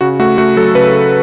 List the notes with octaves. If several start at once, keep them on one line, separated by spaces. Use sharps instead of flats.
C#3 F#4
A3 F#4
A3 F#4
F#3 A4
C#3 B4